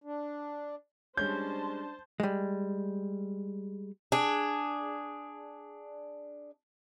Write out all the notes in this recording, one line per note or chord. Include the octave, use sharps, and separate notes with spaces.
D4
G3 G#3 C#4 D4 C5 A5 G6
G3 G#3
D4 G#4